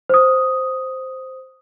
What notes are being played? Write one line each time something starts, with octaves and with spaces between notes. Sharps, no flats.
C5 D#6